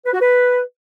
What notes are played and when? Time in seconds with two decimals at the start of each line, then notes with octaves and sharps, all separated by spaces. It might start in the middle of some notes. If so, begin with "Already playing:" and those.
0.06 B4
0.13 F#4
0.21 B4